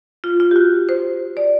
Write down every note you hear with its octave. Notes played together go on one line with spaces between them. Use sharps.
F4
F4
G4
F#4
C5
D5